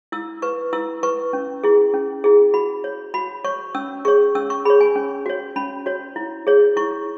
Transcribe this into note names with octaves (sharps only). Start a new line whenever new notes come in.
E4 E6
B4 C#6
E4 E6
B4 C#6
C#4
E4 G#4
C#4
E4 G#4
F#4 B5
C#5
F#4 B5
C#5 C#6
C#4 E6
G#4 C#5 C#6
C#4 E6
C#6
G#4 C#5 B5
G#5
C#4
F#4 C#5
C#4 B5
F#4 C#5
E4
G#4 C#5
E4 C#6